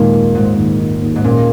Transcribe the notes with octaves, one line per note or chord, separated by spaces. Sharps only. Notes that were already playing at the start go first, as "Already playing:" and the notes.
Already playing: D#2 A#2 G#3
D#3
G#2 G#3
D#2
D#3
D#2
G#2
A#2 C#4